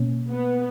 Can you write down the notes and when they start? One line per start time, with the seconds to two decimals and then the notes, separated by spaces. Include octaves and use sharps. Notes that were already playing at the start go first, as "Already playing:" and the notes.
Already playing: B2 A#3 C#4
0.30 B3